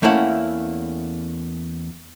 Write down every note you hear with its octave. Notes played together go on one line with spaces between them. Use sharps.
E2 A3 A#3 C#4 E4 F#5